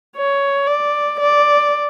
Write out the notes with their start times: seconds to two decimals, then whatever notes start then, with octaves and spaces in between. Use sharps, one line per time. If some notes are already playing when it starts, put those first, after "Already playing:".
0.16 C#5
0.67 D5
1.20 D5